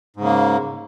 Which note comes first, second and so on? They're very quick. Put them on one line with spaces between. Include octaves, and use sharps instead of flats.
G#2 C#3 A#3